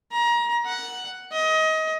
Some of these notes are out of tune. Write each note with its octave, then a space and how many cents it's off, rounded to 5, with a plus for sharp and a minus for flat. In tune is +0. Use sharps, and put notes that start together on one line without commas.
A#5 +30
F#5 +5
D#5 +25